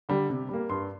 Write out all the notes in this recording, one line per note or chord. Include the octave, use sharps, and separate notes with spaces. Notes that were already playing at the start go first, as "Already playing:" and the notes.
D3 G3
C3
G3 A#3
G2 C6